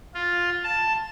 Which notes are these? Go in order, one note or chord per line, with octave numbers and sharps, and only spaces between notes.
F4
A5